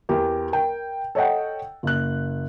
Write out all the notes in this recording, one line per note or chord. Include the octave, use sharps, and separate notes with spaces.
E2 G4 A#4
A#4 G5
A4 C#5 D#5 F#5 G5
F#1 F#6